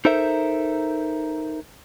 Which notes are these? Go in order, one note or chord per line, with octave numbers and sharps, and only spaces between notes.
D#4 A4 A#4 C5 E5